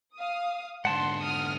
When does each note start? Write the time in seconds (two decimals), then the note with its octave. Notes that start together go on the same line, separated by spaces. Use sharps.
0.15 F5 D#6
0.85 G#2 D3 F#5 A5 C6
1.21 D#6 F6